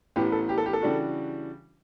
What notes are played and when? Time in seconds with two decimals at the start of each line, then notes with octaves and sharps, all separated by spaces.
0.16 A1 A2 E3 B3 G4
0.32 A4
0.49 G4
0.58 A4
0.66 G4
0.73 A4
0.82 C#3 E3 G3 D4 F#4